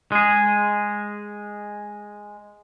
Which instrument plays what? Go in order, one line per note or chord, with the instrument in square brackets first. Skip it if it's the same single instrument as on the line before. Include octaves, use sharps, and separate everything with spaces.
[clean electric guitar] G#3 G#4